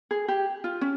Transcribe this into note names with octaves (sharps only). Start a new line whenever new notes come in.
G#4
G4
F4
C#4